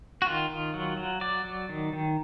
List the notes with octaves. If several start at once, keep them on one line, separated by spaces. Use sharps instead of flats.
F#4
D#3 F4
D#3
F#3
F#3
F#3 D5
F#3
D#3
D#3